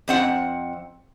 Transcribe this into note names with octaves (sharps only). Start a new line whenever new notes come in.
F2 C4 F#5